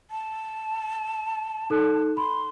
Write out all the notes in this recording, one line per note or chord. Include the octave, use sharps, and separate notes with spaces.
A5
D#4 A4 F#6
B5 C6